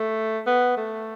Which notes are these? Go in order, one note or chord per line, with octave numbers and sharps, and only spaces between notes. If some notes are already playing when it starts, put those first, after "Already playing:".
Already playing: A3
B3
A3